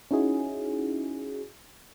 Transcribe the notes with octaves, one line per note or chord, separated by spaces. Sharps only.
C#4 D#4 E4 F#4 G#4